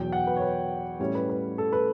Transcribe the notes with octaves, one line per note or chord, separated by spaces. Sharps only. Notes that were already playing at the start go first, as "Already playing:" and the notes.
Already playing: E2 B2 F#3 G5
F#5
B4
C#5
B4
A2 G3 C#4 C#5
B4
B4
A4
B4